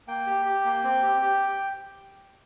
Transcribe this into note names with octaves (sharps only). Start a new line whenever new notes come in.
A#3 G5
G4
G4
A#3
C4
G4
G4